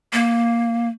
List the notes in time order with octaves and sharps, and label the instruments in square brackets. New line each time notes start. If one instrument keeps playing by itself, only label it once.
[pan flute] A#3